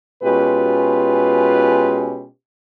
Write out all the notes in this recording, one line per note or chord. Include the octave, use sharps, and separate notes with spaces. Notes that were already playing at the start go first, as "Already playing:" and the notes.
B2 G#3 C#4 F4 G4 B4